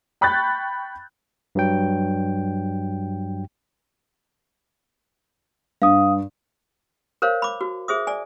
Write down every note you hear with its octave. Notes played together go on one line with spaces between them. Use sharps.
G5 B5 C#6 F#6 G6 A6
G2 F#3 G5
G2 F5 D#6
A#4 C5 C#5 F5
B5 D6
F#4
G#4 C5 E5 D#6
D5 G#5